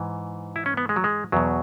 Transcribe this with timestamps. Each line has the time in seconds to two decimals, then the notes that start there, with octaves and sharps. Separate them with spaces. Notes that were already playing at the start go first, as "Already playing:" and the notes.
Already playing: G#2 E3
0.56 E4
0.66 C#4
0.77 B3
0.89 G#3
0.96 F#3
1.04 G#3
1.32 E2 B2 F#3